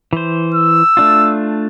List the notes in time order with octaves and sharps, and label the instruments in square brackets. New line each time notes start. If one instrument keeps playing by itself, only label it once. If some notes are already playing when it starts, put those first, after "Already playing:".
[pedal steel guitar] E3 C5
[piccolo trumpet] E6
[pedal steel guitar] A3 D4 F4